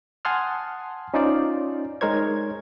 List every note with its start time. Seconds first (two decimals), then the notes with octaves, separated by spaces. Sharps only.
0.25 F#5 G#5 A5 C6 D#6 F6
1.14 C#4 D#4 F4 C5 D5
2.01 G#3 D#4 A#4 C5 C#5 G#6